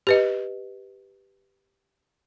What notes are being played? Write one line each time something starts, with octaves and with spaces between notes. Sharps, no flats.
G4 B4 D#5